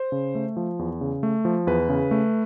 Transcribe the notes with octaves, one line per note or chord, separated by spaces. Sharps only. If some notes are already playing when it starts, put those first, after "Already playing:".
Already playing: C5
C#3
A3
F3
E2
C#3
A3
F3
E2 B4
C#3
A3